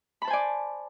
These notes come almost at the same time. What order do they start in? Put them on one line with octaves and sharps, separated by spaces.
B5 A5 C5 G#5 D5